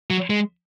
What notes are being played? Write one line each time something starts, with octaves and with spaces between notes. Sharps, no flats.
F#3
G#3